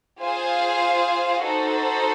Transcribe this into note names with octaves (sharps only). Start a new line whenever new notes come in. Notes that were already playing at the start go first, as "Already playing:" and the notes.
F4 G#4 C5 F5 G#5
D#4 F#4 A4 C5